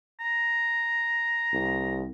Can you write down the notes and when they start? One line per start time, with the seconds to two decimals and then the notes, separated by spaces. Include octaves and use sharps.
0.20 A#5
1.53 C2